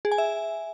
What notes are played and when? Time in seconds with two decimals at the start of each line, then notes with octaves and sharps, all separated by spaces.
0.05 G#4
0.12 G#5
0.18 E5